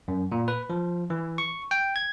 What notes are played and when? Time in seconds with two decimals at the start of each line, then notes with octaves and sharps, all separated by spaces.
0.08 F#2
0.32 A#2
0.48 B4
0.70 F3
1.10 E3
1.38 C#6
1.71 G5
1.96 G#6